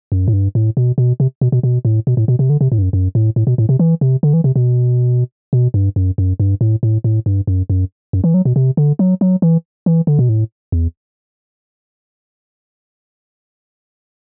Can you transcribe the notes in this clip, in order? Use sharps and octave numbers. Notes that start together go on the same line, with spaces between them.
F#2
A2
G2
A2
B2
B2
C3
B2
B2
B2
A2
B2
A2
B2
C3
D3
C3
A2
G2
F#2
F#2
A2
A2
B2
A2
C3
E3
C3
D3
E3
C3
B2
B2
G2
F#2
F#2
G2
A2
A2
A2
G2
F#2
F#2
F#2
E3
F#3
B2
C3
D3
F#3
F#3
E3
E3
D3
B2
A2
E2